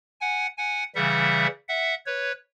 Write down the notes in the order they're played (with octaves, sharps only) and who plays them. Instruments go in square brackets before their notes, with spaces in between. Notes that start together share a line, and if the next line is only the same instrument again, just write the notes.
[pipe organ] F#5 G#5
F#5 G#5
C#3 E3 G3 E5 F#5
E5 F#5
B4 C#5